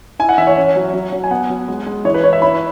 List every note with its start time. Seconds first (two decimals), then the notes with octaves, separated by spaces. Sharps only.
0.19 E4 G#5
0.29 F#5
0.38 E3 E5
0.47 C#5
0.56 C#4
0.76 F#3
0.93 F#3
1.12 F#3
1.24 G#5
1.31 B3 F#5
1.50 F#3
1.68 G#3
1.86 G#3
2.05 E3 C#5
2.14 B4
2.24 E4 C#5
2.33 E5
2.42 E4 B5